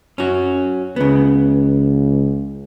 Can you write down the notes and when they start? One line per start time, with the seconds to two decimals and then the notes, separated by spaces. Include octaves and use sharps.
0.18 F#2 C#4 F#4
0.96 C#2 C#3 B3